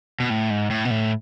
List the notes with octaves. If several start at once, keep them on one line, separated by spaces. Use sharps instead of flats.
B2
A2
G#2
A2
B2
A2